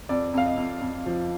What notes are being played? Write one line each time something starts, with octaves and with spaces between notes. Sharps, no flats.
F2 D5
F2 F5
D#5
F2
F2
F3